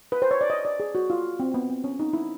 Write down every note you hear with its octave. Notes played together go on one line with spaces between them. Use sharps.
B4
C5
C#5
D5
D#5
D5
G#4
F#4
F4
C4
B3
C4
C#4
D#4
E4